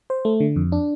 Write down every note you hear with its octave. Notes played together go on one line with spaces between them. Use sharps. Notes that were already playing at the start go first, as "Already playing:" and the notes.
C5
A3
D3
F2
D4